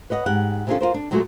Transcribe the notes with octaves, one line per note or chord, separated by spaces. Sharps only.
B4 C#5 D#5 F#5
G#2 G4 F#5
C3 D#3 C#4 D4 F4 A4
F4 A#4 C5
D4
A#2 F#3 G#3 A3 B3 F#4